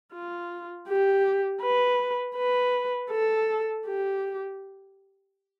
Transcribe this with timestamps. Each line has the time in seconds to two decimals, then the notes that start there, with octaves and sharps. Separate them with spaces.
0.13 F4
0.88 G4
1.62 B4
2.37 B4
3.11 A4
3.86 G4